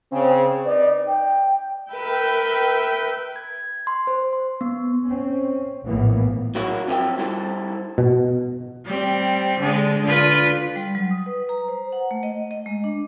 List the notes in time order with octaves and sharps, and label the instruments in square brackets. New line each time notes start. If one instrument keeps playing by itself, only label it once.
[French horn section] C#3 C4
D#4 B4 D5
[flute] G5
[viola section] A#4 B4 E5 G5
[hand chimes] G#6
C6
C5
C6
B3
[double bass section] C4 C#4
A#1 A2 E3 A#3 B3
[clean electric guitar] F#3 A#3 E4 F#4
F2 F3 F#3 E4 E5 G5
G3 E4 A4 C5
[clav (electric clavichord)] B2
[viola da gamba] G3 C4
D3 G#3
D3 F4 B4
[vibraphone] G3
F#3
D#6
B4
A#5
C5
F#5
A3
D#5
D#5
G#3
D4